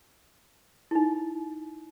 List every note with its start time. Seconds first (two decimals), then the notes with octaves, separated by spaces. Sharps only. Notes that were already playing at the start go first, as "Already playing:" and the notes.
0.91 D#4 E4